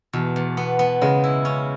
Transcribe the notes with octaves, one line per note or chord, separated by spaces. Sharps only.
E2 B2
E2
B3
B3
C#3 G#3
E4
C#4